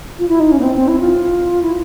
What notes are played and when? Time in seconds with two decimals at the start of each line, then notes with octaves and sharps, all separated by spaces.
0.19 F4
0.28 E4
0.40 D#4
0.52 C#4
0.59 B3
0.63 C4
0.76 C4
0.88 E4
1.00 F4
1.62 E4